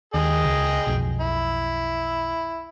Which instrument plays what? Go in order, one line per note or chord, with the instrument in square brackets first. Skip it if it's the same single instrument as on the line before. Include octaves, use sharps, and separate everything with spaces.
[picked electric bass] D#2 [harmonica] G#4 D#5 G5
[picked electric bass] C#2
B1 F2
[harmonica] E4